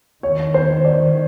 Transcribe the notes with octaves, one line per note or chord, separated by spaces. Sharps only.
D#3 C#5
C5
D5